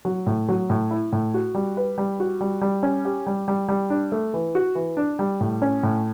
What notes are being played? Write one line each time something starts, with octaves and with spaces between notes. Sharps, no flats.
F#3
A2
F#3
A2
E4
A2
F#4
G3
B4
G3
F#4
G3
G3
C#4
G4
G3
G3
G3
D4
A3
E3
F#4
E3
D4
G3
A2
C#4
A2